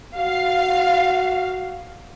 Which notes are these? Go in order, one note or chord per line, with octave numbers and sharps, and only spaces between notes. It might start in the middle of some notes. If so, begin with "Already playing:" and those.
F#4 F5